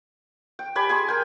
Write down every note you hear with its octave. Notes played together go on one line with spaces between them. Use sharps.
G5
G4 D5 G#5 B5
G#4 G#5 C6
A#4 G5